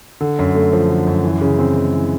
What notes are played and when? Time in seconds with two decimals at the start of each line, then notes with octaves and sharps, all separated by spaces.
0.21 D3
0.39 F#2
0.55 A3
0.73 F3
0.89 D3
1.07 F#2
1.24 E3
1.41 C#3
1.59 C4
1.75 G#3
1.92 E3